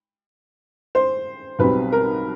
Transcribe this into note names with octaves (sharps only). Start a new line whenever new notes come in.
C5
B1 B2 G3 C4 B4
A#4